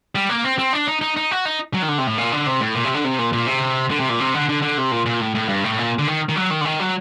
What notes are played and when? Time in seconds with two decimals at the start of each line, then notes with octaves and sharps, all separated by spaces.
0.15 G3
0.29 A#3
0.44 C4
0.59 C4
0.73 D4
0.88 D#4
1.01 D#4
1.16 D#4
1.31 F#4
1.45 D#4
1.74 F#3
1.82 D#3
1.88 D3
1.98 C3
2.07 A2
2.18 A#2
2.32 D3
2.46 C3
2.61 A2
2.75 A#2
2.84 C3
2.94 D3
3.04 C3
3.19 A#2
3.33 A#2
3.47 C3
3.91 D3
4.00 C3
4.09 A#2
4.20 C3
4.34 D3
4.49 D3
4.62 D3
4.78 C3
4.92 A#2
5.06 A#2
5.21 A2
5.35 A2
5.49 G2
5.64 A2
5.78 A#2
5.99 D3
6.07 D#3
6.29 D#3
6.36 F#3
6.50 D#3
6.61 D3
6.65 D#3
6.80 F#3